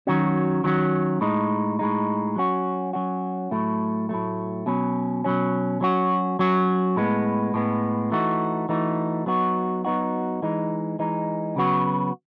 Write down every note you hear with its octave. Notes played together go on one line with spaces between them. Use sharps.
D#3 F#3 C#4 F#4
D#3 F#3 C#4 F#4
A2 G#3 D#4
A2 G#3 D#4
F#3 C#4 F#4
F#3 C#4 F#4
A2 F#3 A3
A2 F#3 A3
B2 F#3 C#4
B2 F#3 C#4
F#3 C#4 F#4
F#3 C#4 F#4
A2 G#3 B3
A2 G#3 B3
E3 A3 D#4 F#4
E3 A3 D#4 F#4
F#3 B3 D#4 F#4
F#3 B3 D#4 F#4
E3 G#3 D#4
E3 G#3 D#4
C#3 F#3 B3 F#4